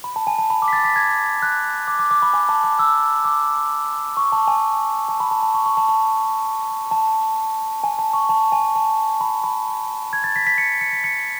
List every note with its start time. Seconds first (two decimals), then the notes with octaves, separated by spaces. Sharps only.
0.04 B5
0.16 A5
0.27 G#5
0.39 A5
0.50 B5
0.62 D6
0.68 B6
0.73 A6
0.84 B6
0.96 G#6
1.42 F#6
1.88 D6
1.99 D6
2.11 D6
2.22 B5
2.34 G#5
2.49 A5
2.64 D6
2.79 E6
3.25 D6
4.17 C#6
4.32 A5
4.48 G#5
5.09 A5
5.20 B5
5.31 A5
5.43 A5
5.54 C#6
5.66 C#6
5.77 A5
5.89 A5
6.00 B5
6.91 A5
7.84 G#5
7.99 A5
8.14 C#6
8.29 A5
8.52 G#5
8.76 A5
9.21 B5
9.44 B5
10.13 G#6
10.24 A6
10.36 B6
10.47 B6
10.58 C#7
10.81 C#7
10.93 B6
11.04 C#7